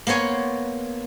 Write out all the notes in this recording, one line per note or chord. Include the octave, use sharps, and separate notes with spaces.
A#3 B3 C5 C#5 G#5